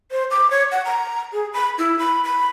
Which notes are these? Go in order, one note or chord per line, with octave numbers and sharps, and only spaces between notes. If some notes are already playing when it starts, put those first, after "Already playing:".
C5
D6
C#5
F#5
A#5
G#4
B5
E4
B5
B5